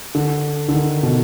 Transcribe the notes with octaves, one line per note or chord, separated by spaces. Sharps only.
D3
D3
D#3
B2